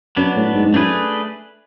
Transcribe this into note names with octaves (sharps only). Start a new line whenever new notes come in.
F#2 F#3 B3 D4
A2
G#2
G#2
F#2 A3 D4 G#4 B4